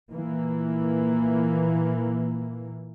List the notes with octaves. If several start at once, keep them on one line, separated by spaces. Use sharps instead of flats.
A#2 E3 A#3